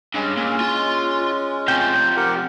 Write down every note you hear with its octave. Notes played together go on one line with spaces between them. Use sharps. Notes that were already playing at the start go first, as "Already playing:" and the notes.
G2 G#3 C#4
A#2
F4 C6
C3 F3 G5
G4 A#4 F#5